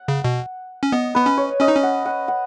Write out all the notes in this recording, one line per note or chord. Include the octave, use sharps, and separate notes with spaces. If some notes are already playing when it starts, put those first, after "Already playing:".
Already playing: F#5
C#3
B2
C#4
B3 D#5
B3 B4
C#4
C#5
C#4 D#5
D#4
C#4
F#5
F#5
F#5